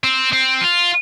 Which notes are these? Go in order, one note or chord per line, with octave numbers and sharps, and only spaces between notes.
C4
C4
F4